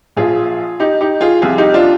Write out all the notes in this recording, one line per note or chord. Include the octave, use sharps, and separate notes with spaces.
A#1 A#2 F3 F4 G#4
D#4 G4
D#4 G4
F4 G#4
C2 C3 F3 F4 G#4
D#4 G4
D4 F4